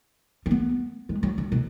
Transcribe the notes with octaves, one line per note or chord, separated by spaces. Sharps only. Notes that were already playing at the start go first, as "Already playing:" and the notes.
C#4
B3
G#3
F#3
D3
B2